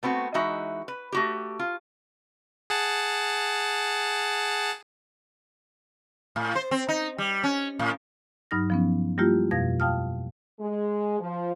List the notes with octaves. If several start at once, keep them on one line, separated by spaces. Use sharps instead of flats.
A3 B3 C4 F#4
E3 G#3 D#4 F#4 E5
B4
A3 F#4 G4
F4
G#4 F#5 A5
A2
C5
C4
D#4
G3
C#4
A2
G2 F#3 D#4 F6 A#6
F3 B3 C#4
G3 A3 A#3 E4 F4 G4
F2 B2 F5 G#6 A#6
F5 G5 A5 D#6 F6
G#3
F3